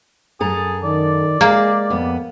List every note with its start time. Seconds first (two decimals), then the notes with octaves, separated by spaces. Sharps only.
0.40 F#2 G#4 A4 A#5
0.84 D#3 D5
1.41 G#3 A#3 G#4
1.90 F2 B3